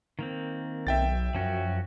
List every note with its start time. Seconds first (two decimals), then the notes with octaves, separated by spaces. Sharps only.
0.19 D#3 A#3 C4
0.87 B1 E5 G5 A6
1.35 F#2 F3 C#4 F#4